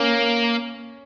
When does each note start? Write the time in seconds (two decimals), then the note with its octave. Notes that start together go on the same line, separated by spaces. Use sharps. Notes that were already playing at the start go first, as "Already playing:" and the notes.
Already playing: A#3 C#4